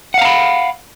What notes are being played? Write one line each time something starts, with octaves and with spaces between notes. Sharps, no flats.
F5 F#5 A#5 B5